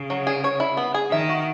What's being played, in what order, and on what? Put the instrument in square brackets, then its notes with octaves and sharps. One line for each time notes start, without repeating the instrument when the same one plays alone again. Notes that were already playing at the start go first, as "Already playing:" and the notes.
Already playing: [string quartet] C#3
[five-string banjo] F#3
G#4
C#5
E4
B3
G#4
[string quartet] D#3 [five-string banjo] E5
[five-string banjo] F#4